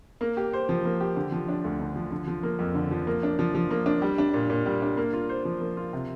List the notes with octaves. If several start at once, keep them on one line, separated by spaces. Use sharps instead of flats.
A#3
G4
C5
F3
A#3
G4
D3
F3
D4
D2
D3
F3
D3
F3
A#3
F2
D3
F3
A#3
D4
F3
F3
A#3
D4
G3
D4
A#2
A#2
G3
D4
A#3
F4
C5
F3
A#3
F4
C3